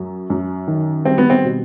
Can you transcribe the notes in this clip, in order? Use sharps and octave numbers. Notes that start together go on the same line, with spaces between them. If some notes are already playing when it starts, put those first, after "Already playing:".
Already playing: F#2 F#3
F#2
D#3
G3 C4
B3
C4
B2